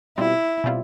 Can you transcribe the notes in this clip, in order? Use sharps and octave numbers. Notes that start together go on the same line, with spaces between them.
B2 G3 C4 E4 F4
B2 G3 C4 F4